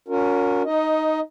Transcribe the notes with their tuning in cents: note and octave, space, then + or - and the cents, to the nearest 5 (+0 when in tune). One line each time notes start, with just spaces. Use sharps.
C#4 +25 F#4 -45 A#4 -10
D#4 +0 D#5 +15